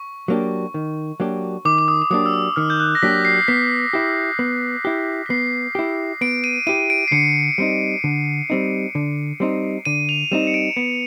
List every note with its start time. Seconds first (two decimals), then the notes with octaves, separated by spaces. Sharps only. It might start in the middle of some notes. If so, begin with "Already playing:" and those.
Already playing: C#6
0.28 F#3 A#3 D4 G4
0.74 D#3
1.20 F#3 A#3 D4 G4
1.65 D#3 D6
1.78 D6
1.88 D#6
2.02 D6
2.11 F#3 A#3 D4 G4 D#6
2.26 E6
2.34 D#6
2.56 D#3 F6
2.70 G6
2.80 F#6
2.95 A#6
3.02 F#3 A#3 D4 G4 B6
3.25 C7
3.48 B3 B6
3.93 E4 G4
4.39 B3
4.85 E4 G4
5.26 B6
5.30 B3 C7
5.75 E4 G4
6.21 B3 D7
6.44 D#7
6.67 E4 G4 D#7
6.90 D7
7.08 C7
7.12 D3 C#7
7.58 G3 C4 D#4
8.04 D3
8.50 G3 C4 D#4
8.95 D3
9.40 G3 C4 D#4
9.85 D3 D#7
10.09 F7
10.32 G3 C4 D#4 E7
10.47 C#7
10.54 D7
10.77 B3 C#7